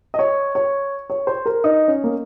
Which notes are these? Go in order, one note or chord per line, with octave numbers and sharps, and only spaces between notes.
D#5
C#5
C#5
C#5
C5
A#4
D#4
C#4
A#3